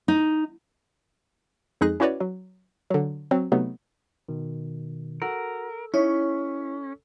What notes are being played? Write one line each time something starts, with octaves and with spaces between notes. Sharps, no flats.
D#4
F2 G#3 D#4 G#4 F#6 A#6
C#4 E4 F#4 B4 C#5 D5
F#3
D3 F#3
F#3 C4
C3 F#3 A3 B3 D#4
B2 D#3
F#4 A4 A#4 E6
C#4 D#4 E4 C#5